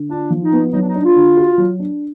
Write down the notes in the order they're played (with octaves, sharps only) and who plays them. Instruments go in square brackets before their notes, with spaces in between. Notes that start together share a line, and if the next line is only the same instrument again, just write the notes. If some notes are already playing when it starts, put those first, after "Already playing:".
Already playing: [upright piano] D3
[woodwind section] D4 [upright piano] F4
[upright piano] F3
[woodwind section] D#4
[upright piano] B3
[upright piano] F#3 [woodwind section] D#4
[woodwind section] D4
D#4
[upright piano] D4
[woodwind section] F4
[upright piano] D3
F#4
F#3
D4